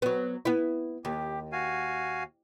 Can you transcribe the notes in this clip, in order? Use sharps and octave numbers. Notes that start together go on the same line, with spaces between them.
F#3 B3
B3 E4
D#2 G4
F#4 F5 G#5